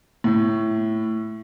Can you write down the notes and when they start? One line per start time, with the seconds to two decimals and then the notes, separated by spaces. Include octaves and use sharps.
0.24 A2